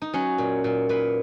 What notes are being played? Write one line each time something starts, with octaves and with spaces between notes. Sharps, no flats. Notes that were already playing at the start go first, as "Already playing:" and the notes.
D#4
F#3 C#4
A#2
A#2
A#2 B4